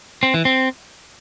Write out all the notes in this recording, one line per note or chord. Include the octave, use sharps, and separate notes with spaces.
C4
E3
C4